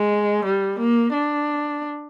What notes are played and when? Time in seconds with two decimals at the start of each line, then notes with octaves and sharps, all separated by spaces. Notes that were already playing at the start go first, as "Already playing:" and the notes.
Already playing: G#3
0.45 G3
0.79 A#3
1.13 D4